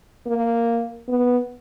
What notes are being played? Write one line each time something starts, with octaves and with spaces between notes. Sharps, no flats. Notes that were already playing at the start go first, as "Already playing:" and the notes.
A#3
B3